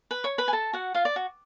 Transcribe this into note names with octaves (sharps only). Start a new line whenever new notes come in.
B4 B5
C#5 C#6
B4 B5
G#5
A4 A5
F#4 F#5
F4 F5
D5
F#4